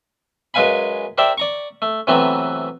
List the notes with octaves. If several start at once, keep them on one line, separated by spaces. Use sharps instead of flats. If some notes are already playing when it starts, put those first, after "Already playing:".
F#2 G#3 B4 F5 G#5 B5
G4 A#4 C5 D5 E5 G5
D5 A#5 C#6
A3
C3 E3 F#3 A3 B3 C4